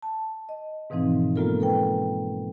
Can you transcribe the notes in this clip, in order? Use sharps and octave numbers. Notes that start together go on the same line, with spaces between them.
A5
D#5
G#2 B2 E3 F3 C4 D#4
G#3 A#3 B3 F4 A4 A#4
A4 B4 G5